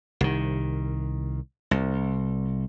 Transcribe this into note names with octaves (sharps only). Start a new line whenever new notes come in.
C2 D#3
C2